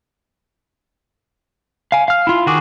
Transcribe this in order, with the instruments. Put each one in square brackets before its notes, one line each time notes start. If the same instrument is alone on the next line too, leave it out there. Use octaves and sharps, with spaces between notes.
[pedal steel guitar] F5 G#5
F5 F6
E4 F4
D#3 F#4 G#4 D6